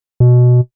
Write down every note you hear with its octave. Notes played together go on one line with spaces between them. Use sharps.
B2